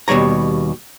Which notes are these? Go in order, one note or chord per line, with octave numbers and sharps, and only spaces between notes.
D#2 B2 G3 C#5 A#5